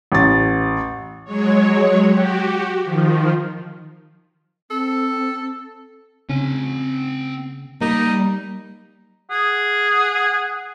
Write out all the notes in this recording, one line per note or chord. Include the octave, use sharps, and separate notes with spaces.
A1 A6
F#3 G#3 C#5
F#4 G4
D#3 F3
C4 A4
C#3 C4 G#5
G3 A#3 D#4
G#4 F#5